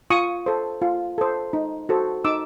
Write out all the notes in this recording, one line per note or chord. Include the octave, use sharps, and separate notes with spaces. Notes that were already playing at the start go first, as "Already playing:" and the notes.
F4 C#6 D#6
A4 C5
F4
A4 C5
D#4
F#4 A4 C5
D#4 D6 E6